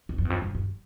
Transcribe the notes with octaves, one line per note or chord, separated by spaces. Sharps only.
E2
F2
E2
F2
G2
G2